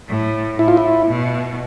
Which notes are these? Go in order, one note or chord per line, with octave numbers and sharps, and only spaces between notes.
A2
A2 E4
F4
E4
B2